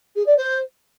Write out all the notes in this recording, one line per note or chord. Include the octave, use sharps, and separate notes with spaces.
G#4
D5
C5